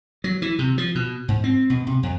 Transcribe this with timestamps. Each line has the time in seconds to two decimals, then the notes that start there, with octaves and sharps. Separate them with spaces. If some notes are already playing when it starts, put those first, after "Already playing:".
0.24 F#3
0.42 E3
0.59 C3
0.78 F3
0.95 B2
1.28 G#2
1.44 C4
1.70 B2
1.87 C3
2.03 F2